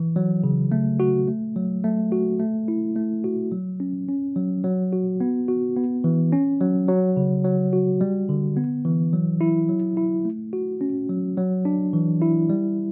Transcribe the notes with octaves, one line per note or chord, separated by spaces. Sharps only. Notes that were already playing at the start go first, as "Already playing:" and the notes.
Already playing: E3
F#3
C#3
A3
F#4
A3
F#3
A3
F#4
A3
E4
A3
F#4
F#3
C#4
C#4
F#3
F#3
F#4
B3
F#4
B3
E3
C#4
F#3
F#3
C#3
F#3
F#4
G3
D3
B3
E3
F#3
E4
F#3
E4
A3
F#4
C#4
F#3
F#3
D4
E3
E4
G3